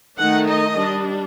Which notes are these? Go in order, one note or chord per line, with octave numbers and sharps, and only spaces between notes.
D#3 A3 D#4 F#5
D#5
G3 D4